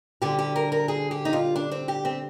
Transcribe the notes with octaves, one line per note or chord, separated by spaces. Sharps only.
D2 D3 G3 G4
G4
A#4
A#4
G#4
G4
D#4
F4
D4
C4
G4
C4